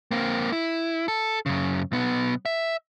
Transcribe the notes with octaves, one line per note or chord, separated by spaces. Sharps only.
A#3 C4
E4
A4
F#2 C#3
B1 B3
E5